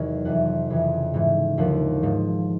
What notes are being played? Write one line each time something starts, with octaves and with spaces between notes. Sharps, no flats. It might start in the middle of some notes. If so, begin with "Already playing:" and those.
Already playing: E2 C3 D#3 F#3
F2 C3 E3 F#5
F2 C#3 E3
G#2 E3
D#2 D3 F3 F#5
G#2 F3